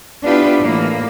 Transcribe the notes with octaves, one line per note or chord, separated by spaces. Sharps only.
B3 D4 E4 F4 G4 B4
A2 E3 A#3